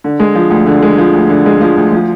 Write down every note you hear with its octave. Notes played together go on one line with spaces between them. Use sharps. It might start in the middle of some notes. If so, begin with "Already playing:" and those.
D3
G#3
F3
D2
D3
G#3
F3
D2
D3
G#3
F3
D2
F3